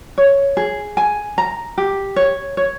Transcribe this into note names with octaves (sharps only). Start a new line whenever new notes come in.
C#5
G#4
G#5
A#5
G4
C#5
C#5